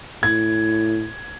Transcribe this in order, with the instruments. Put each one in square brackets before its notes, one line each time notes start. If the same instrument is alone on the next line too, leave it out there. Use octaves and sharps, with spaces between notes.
[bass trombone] A2 [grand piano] G#6